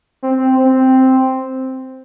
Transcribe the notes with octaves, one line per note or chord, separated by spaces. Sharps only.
C4
C4